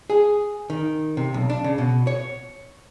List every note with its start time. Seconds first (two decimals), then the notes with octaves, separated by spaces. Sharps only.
0.10 G#4
0.70 D#3
1.17 C3
1.34 B1
1.50 D4
1.64 C#3
1.78 B2
2.07 C#5